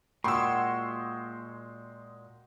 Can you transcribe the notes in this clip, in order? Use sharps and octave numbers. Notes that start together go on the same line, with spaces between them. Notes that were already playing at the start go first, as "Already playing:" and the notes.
A#2 G#3 F#4 G5 C6 C#6 E6